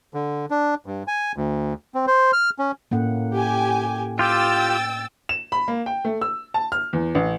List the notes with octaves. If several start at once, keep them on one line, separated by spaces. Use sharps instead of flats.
D3
D4
G2
G#5
D2
C4
C5
F6
C#4
A2 A#3 C#4 F#5
G4 G#5
F4 G4 G5 E6 A6
E7
B5
A#3
G5
A3
E6
A5
F6
E2
A1